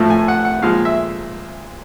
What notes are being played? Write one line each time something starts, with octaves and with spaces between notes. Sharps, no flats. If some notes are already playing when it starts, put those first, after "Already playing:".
Already playing: A2 F3 A3
G#5
F#5
F#5
A#2 F3 G#3 F5
E5